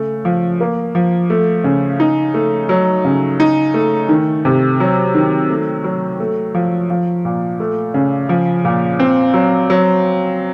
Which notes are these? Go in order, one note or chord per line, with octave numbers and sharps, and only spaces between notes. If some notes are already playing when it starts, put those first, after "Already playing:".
Already playing: C#3 A3
F3
A#3
F3
A3
C#3
D#4
A3
F#3
C#3
D#4
A3
D#3
C3
F#3
D#3
A3
F#3
A3
F3
F3
A#2
A3
C#3
F3
A#2
C4
F#3
F#3